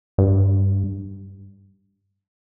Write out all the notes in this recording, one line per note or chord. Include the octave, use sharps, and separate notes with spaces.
G2